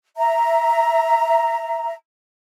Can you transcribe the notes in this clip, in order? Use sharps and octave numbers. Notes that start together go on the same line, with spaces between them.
E5 A#5